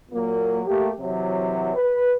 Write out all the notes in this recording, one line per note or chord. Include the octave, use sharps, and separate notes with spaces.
A#2 F#3 A#3
A3 A#3 G4
C3 E3 F#3
B4